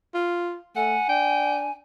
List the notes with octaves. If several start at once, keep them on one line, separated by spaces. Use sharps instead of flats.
F4
A3 F#5 G#5
D4 G5